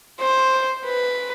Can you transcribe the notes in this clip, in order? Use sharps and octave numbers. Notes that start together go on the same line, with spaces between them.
C5
B4